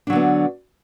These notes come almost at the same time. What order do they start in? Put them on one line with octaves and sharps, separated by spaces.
D4 F#3 D3 B3